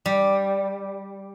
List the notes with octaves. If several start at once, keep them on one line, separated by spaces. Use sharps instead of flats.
G3